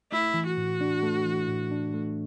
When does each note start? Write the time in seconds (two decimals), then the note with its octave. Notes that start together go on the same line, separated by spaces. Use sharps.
0.11 A3 E4
0.34 E3
0.46 F#4
0.57 A2
0.81 D4
1.03 A3
1.26 E3
1.48 A2
1.71 D4
1.94 A3